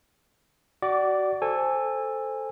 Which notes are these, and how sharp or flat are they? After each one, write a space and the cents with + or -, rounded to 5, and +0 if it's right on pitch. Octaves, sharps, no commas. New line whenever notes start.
F#4 +25 D5 +0 D6 -15
A4 +0 C5 +0 G#5 -20